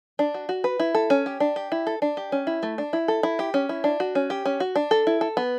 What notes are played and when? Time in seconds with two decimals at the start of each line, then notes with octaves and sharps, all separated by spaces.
0.19 D4
0.34 F#4
0.49 F#4
0.64 B4
0.79 E4
0.95 A4
1.10 C#4
1.26 G4
1.40 D4
1.56 G4
1.72 E4
1.87 A4
2.02 D4
2.17 G4
2.32 C#4
2.47 E4
2.63 A3
2.78 D4
2.93 E4
3.08 A4
3.23 E4
3.39 G4
3.54 C#4
3.69 E4
3.84 D4
4.00 F#4
4.15 C#4
4.30 G4
4.46 C#4
4.60 F#4
4.76 D4
4.91 A4
5.07 E4
5.21 A4
5.37 B3